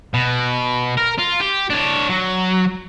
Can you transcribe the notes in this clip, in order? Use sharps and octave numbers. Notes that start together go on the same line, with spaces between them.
B2
A#4
F4
G4
D4 C#5
F#3